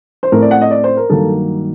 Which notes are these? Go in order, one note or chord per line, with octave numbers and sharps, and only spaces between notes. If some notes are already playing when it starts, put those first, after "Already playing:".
C5
A2 A3 C4 A#4
D5
F#5
D#5
D5
C5
A#4
G2 D#3 F#3 A#3 A4